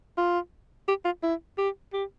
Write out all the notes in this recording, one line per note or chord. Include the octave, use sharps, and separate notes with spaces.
F4
G4
F4
E4
G4
G4